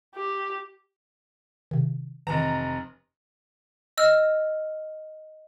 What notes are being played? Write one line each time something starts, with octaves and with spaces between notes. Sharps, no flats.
G4
C3 D#3
F1 D#3 E3 A#5
D#5 E6 F6